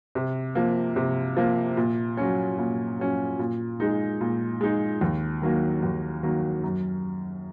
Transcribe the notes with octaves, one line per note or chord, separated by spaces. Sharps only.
C3
F3 A#3
C3
F3 A#3
A#2
F#3 C#4
A#2
F#3 C#4
A#2
G#3 D#4
A#2
G#3 D#4
D#2
D#3 F#3 A#3
D#2
D#3 F#3 A#3
F#2